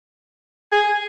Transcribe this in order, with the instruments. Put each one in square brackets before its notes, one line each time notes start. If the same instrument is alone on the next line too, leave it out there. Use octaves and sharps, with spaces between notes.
[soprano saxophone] G#4